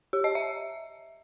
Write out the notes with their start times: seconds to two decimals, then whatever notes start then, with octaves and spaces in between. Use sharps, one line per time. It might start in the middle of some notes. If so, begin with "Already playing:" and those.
0.13 G4
0.24 D#5
0.35 E5